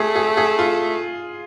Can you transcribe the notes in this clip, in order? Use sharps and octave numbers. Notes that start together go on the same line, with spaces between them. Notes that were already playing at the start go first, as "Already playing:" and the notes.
Already playing: A3 G#4
G#4
G#4
F4